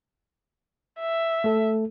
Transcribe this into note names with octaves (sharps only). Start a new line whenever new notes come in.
E5
A3 A4